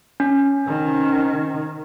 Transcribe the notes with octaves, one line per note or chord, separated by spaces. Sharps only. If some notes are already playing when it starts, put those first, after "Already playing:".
C#4
C3 D#3